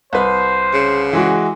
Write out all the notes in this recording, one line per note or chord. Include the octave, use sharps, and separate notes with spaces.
C2 B4 C5
C#3
E3 G#3 F#4